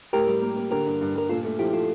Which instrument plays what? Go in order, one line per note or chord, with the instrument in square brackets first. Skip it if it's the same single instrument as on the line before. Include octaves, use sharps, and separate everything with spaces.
[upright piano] A2 [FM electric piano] G4 A#4
[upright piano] G3
A#3
A#3
[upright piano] D3 [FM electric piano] G4 A#4
[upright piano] G2
G2
[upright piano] G2 [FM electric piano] A#4
[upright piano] A#2 [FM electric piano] F4 A4
[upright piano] A3
[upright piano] F3 [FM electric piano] E4 G4
[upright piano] F3 [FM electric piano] F4 A4